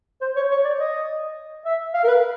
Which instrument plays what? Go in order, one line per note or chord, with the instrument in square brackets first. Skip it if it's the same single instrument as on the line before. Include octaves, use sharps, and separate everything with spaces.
[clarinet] C5
C#5
C#5
D5
D#5
E5
F5
A#4
B4